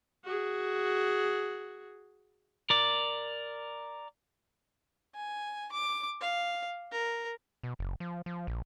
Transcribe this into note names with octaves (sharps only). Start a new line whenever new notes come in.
F#4 G#4
A#4 D5
G#5
D6
F5
A#4
B2
F#1
F3
F3
A#1